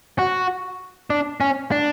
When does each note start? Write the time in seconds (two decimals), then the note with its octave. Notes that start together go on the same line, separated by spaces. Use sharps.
0.19 F#4
1.10 D4
1.41 C#4
1.72 D4